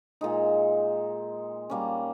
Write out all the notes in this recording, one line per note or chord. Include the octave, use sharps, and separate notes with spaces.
A#2 G#3 D#4
G3 A#3 C#4